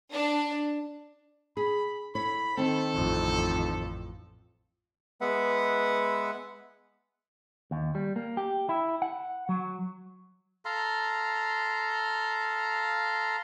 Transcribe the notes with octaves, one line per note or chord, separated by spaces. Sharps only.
D4
G#4 B5
E4 A4 C#5 B5
D#3 C4 A4
A1 F2
G#3 B3 B4 E5 F#5
D#2
G3
A#3
G4
E4
F#5
F#3
A4 F5 A#5 C6